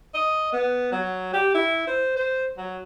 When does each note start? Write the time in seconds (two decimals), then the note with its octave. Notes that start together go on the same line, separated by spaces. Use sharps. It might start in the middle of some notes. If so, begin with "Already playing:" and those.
0.14 D#5
0.52 B3
0.92 F#3
1.34 G4
1.55 E4
1.87 C5
2.16 C5
2.57 F#3